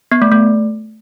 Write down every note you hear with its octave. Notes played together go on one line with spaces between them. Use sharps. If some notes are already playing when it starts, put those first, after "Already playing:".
B3
A3
A3